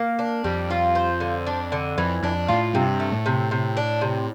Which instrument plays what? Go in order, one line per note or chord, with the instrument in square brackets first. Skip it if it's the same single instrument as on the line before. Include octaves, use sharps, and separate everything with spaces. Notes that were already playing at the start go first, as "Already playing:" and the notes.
Already playing: [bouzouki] A#3
D4
[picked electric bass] F2 [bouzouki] G3
[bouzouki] F4
C5
D3
D4
D3
[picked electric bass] F2 [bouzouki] E3
[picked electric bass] F2 [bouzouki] D4
[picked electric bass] A2 [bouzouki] F4
[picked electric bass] G2 [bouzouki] C3
[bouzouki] A3
[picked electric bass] A2
[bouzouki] C3
C3
D4
C3